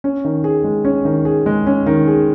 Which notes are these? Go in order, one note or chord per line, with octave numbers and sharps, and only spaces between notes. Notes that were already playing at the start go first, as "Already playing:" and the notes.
C#4
D#3
G#4
G#3
C#4
D#3
G#4
G#3
C#4
D#3
G#4